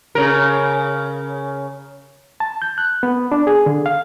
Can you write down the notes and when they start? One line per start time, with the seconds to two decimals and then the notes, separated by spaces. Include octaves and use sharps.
0.15 C#3 A#4
2.40 A5
2.62 G6
2.78 F#6
3.03 B3
3.32 D4
3.47 G#4
3.66 D3
3.86 F5